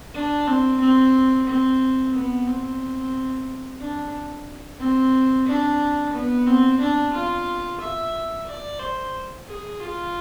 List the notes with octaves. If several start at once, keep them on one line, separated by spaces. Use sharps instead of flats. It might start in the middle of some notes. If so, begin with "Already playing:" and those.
D4
C4
C4
C4
B3
C4
D4
C4
D4
B3
C4
D4
F4
E5
D5
C5
G#4
F4